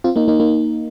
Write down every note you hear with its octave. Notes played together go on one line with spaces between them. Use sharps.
C4 F4
A#3 D#4
A#3 D#4
A#3 D#4